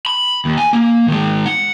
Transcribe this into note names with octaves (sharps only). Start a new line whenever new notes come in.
B5
D#2
G#5
A#3
D#3 G#3
F#5